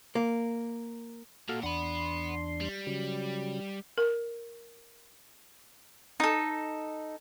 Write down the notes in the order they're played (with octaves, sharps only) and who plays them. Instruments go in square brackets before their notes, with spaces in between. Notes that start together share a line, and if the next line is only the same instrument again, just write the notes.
[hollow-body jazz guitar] A#3
[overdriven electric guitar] A#2 [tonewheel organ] F#4 A4 F5
[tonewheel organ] E2 D4 C6 [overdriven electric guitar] F#5 B5
[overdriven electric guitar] G3
[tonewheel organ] C#3 F#3
[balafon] A#4
[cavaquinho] D#4 A4